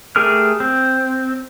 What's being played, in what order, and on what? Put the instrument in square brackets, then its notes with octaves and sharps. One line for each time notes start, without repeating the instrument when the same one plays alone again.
[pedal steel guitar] A3 G4 G#4 A#4 F6
C4